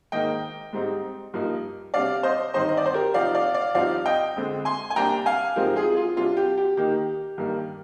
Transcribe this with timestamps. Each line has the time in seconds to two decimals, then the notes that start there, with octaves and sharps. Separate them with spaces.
0.12 G#2 D#3 A#3 D#4 D#5 G5
0.73 G#2 G3 C4 D#4
1.34 G2 F3 A#3 D#4
1.94 C3 G3 D4 D5 F5
2.23 C5 D#5
2.54 G2 D#3 G3 C4 D#4 C5 D#5
2.69 D#5
2.77 D5
2.86 C5
2.94 G4 A#4
3.14 C3 F3 C4 D#4 D5 F5
3.35 D5 F5
3.54 D5 F5
3.75 G2 F3 C4 D#4 D5 F5
4.06 D#5 G5
4.36 F2 D3 G#3 C4
4.65 G#5 C6
4.90 G#5
4.96 C3 G3 A#3 D4 G5 A#5
5.26 F5 G#5
5.56 G#2 F3 C4 D#4 G4 A#4
5.76 F4 G#4
5.97 F4
6.16 C3 G3 D4 F4
6.37 G4
6.58 G4
6.77 D#3 A#3 D#4 G4
7.38 G2 D#3 G3 A#3